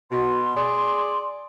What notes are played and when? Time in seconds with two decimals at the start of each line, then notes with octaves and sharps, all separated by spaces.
0.11 B2 C6
0.56 G#4 D5